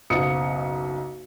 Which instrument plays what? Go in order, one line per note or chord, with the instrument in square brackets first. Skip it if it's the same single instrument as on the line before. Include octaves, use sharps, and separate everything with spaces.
[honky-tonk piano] F#1 B1 D#6 C#7